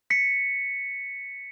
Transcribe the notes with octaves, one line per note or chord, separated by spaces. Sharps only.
B6 C#7